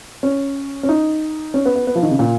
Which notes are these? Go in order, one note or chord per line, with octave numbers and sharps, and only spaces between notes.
C#4
C#4
D#4
C#4
B3
B3
B3
F3
D#3
C#3
A#2